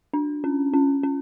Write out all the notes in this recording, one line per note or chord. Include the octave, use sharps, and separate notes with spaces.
D4
C#4
C#4
C#4